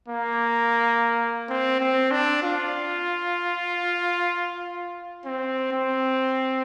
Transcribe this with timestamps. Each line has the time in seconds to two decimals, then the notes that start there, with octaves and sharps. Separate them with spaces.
0.08 A#3
1.49 C4
1.80 C4
2.11 D4
2.43 F4
5.25 C4
5.72 C4